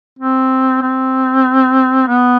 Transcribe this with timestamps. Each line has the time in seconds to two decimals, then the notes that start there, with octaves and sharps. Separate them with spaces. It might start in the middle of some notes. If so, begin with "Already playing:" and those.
0.19 C4
0.82 C4
2.07 B3